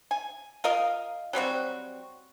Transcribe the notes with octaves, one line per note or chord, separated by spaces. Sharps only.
G#5
F4 A#4 D#5 F5
F#3 G3 C4 F#4